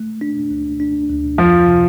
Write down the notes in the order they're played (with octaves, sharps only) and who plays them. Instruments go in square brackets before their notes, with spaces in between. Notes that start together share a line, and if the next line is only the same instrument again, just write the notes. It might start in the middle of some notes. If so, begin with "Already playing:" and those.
Already playing: [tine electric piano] A3
D4
D2
D4
D2
[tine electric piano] F2 [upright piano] F3
[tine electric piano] C3